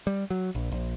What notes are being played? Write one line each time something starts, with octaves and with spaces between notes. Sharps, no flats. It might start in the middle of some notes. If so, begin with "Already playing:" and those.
G3
F#3
A#1
A#1